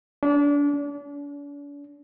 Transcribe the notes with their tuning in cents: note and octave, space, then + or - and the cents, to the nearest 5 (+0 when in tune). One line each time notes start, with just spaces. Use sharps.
D4 -30
D4 -45